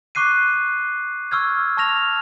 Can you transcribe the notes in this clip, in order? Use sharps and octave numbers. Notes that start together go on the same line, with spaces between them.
C#6 D6 F#6 C7 D#7
C#6 E6 F6 G#6
A5 C#6 F6 A#6 F7